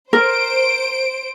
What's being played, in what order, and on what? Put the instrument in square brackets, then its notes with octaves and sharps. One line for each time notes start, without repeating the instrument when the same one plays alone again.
[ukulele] A#4 [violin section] C5 D7